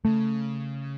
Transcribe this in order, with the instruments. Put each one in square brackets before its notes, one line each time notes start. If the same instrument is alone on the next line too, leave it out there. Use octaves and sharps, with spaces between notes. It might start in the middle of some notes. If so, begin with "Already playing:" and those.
[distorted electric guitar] C#3 [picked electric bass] A3